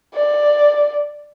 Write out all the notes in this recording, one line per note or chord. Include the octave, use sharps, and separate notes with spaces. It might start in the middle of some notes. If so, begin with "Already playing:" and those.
D5